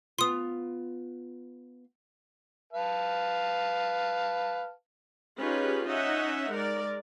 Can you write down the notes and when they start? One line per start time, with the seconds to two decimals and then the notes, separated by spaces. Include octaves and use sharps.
0.19 B3 F4 C6 D#6
2.73 B4 F5 A5
5.38 C#4 D#4 F4 G4 G#4 B4
5.87 C#4 D#4 D#5 E5 F#5
6.50 G#3 A#4 D5